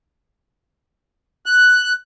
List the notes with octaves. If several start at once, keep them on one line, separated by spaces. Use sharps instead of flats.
F#6